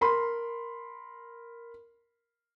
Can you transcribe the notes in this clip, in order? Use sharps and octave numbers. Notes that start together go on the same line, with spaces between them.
A#4 B5 C6